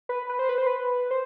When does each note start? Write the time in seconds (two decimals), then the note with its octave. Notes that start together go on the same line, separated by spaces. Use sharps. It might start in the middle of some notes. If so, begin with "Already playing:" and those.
0.09 B4
0.29 B4
0.39 C5
0.49 B4
0.58 C5
0.67 B4
1.11 C5